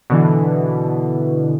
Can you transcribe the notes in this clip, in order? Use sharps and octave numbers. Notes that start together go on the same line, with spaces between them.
B2 D3 E3